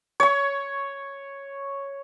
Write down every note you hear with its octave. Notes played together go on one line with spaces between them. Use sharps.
C#5 C#6